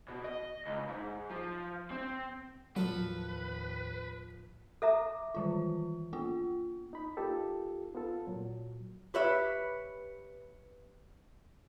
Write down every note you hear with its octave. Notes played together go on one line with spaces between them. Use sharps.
B2
D#5
C#2
G#2
F3
C4
D#2 A2 F3 F#3 A4 B4
A4 E5 A#5 D6
D#3 E3 F4
A#3 B3 F4
D#4 B5
A#3 D#4 F4 G4 A4
B3 F4 A4
A#2 F#3
G4 B4 C#5 E5